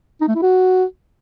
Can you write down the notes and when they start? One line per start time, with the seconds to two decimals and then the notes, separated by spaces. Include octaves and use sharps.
0.21 D#4
0.28 A3
0.35 E4
0.42 F#4